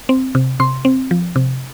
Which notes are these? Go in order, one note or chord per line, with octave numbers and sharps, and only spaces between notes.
C4
C3
C3 C6
C4
F3
C3